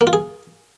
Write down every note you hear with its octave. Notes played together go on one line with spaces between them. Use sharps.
A#3
F4
G#4